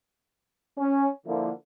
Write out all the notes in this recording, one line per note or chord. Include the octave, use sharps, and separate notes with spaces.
C#4
D3 F3 A#3 E4